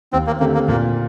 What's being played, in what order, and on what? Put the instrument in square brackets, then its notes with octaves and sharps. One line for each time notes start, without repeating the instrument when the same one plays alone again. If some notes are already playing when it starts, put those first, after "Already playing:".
[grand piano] D#2 [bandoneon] C4
[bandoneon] A#3
[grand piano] D3 A3 C4 G4 [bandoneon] A#3
[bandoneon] A#3
[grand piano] A#2 [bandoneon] A#3